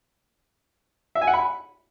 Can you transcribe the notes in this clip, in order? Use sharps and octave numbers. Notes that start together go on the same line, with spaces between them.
E5
G#5
F#5
B5